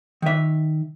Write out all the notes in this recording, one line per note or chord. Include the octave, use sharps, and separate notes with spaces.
D#3 E5